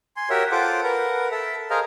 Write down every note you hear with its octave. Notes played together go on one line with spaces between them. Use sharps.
G#5 C6
F#4 G4 A#4 C#5 E5
F4 A4 C5 F#5 D6
A#4 B4 F#5
A4 E5
G#4 A#4 C5 D#5 F5 A#5